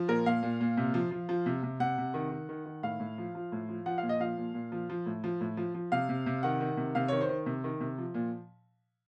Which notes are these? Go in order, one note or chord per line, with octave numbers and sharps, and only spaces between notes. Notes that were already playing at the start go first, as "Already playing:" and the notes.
Already playing: F3
A#2 A#4
A#2 F5
A#2
A#2
C3
F3
F3
F3
C3
C3
C3 F#5
C3
D#3
D#3
D#3
D#3
A2 F5
A2
F3
F3
A2
F3
F3 F#5
A#2 F5
D#5
F3 F5
A#2
A#2
F3
F3
A2
F3
A2
F3
F3
C3 F5
C3
C3
D#3 F#5
D#3
C3
C3 F5
D#3 C#5
C5
D#3
C3
D#3
C3
F3
A#2